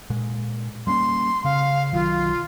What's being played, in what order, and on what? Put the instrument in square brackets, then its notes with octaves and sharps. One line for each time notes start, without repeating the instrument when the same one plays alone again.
[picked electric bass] A#2 G#3
[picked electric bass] G3 A#3 C#4 [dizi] C6
[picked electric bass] C#3 [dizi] F5
[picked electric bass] B1 D#3 F#3 [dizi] F4